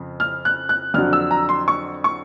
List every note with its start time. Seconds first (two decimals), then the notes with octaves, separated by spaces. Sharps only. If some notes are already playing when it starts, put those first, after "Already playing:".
Already playing: F2 C#3
0.20 F6
0.45 F#6
0.69 F#6
0.94 F2 D3 F#3 F6
1.13 E6
1.31 A#5
1.49 C6
1.68 C#6
2.04 C#6